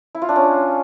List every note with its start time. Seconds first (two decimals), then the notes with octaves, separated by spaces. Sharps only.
0.15 E4
0.22 F4
0.29 D4
0.36 C#4